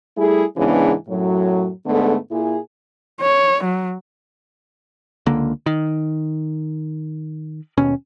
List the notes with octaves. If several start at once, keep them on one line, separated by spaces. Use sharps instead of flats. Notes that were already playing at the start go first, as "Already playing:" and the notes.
G3 A3 E4 G#4
G#2 C#3 E3 B3 D4
F#2 A2 F#3
G#2 D3 A3 B3
A#2 E4 G#4
C#5
F#3
C#2 D3 A#3
D#3
D#2 B2 C#4